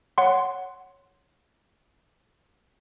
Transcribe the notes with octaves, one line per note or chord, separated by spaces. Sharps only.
C#5 F#5 C6